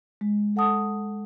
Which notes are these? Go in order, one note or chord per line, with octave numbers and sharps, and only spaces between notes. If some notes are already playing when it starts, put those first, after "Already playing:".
G#3
A4 F#5 A5 D#6